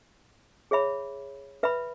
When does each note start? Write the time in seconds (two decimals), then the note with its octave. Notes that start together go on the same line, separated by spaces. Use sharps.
0.71 G#4 C#5 E5 B5
1.63 B4 E5 B5